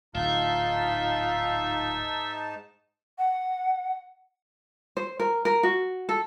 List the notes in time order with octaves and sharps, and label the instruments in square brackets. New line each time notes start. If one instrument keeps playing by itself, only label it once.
[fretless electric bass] D1 [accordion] G#2 D#4 A5 [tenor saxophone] F4 [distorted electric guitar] E5
[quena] F#5
[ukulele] C5
A#4
A#4
F#4
A4